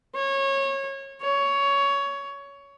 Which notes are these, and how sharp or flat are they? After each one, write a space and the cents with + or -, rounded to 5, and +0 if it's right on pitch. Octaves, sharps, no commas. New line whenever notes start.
C#5 -25
C#5 +15